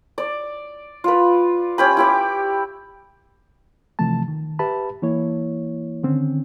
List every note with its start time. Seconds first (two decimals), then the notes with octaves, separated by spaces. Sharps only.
0.18 D5
1.04 F4 B4
1.78 C#4 G4 B5
1.97 E4 G4 D6
3.99 C3 E3 F3 A3 A5
4.28 D#3
4.59 G4 B4 E5 A5 B5
5.02 E3 A#3 E4 C#5
6.03 D3 D#3 C4 C#4